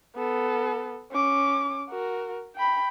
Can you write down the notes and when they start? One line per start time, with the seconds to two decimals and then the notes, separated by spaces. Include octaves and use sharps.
0.16 B3 A4
1.11 C#4 D6
1.90 F#4 A#4
2.56 G5 B5